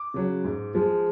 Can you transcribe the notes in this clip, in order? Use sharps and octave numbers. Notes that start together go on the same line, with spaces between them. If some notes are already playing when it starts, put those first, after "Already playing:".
Already playing: D6
C#3 F#3
G#2
F3 G#3